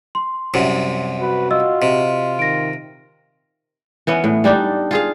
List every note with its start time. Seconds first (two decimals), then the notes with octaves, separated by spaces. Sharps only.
0.15 C6
0.54 C2 F#2 C3
1.21 F#4 B4
1.51 F4 D#5 E6
1.82 C3 D#5
2.39 D#3 A#6 D7
4.07 E3 B3 C#4
4.24 A2
4.44 G3 D4 D#4
4.91 F4 G#4 F5